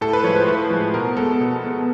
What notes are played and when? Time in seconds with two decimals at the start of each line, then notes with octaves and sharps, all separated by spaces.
0.01 A2 A4
0.13 B4
0.24 F3 G#3 C#5
0.36 C5
0.48 A2 B4
0.70 F3 G#3
0.94 B2 A#4
1.17 G#3 B3 A4
1.41 B2
1.63 G#3 B3